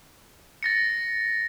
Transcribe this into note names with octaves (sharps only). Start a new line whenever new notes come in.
A6 A#6 C#7